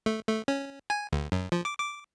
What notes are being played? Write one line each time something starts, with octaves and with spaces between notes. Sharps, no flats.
A3
A3
C#4
G#5
D2
F#2
F3
D6
D6